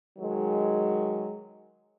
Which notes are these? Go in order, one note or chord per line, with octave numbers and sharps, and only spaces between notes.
D#3 F#3 G#3